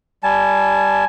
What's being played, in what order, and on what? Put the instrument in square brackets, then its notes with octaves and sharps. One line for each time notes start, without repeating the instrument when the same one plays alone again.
[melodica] G3 A5 [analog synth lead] G#5